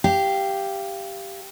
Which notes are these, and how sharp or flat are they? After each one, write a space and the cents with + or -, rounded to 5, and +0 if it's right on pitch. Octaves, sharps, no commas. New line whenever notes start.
G4 +0 F5 -20